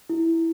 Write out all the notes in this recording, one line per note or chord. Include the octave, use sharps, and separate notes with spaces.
E4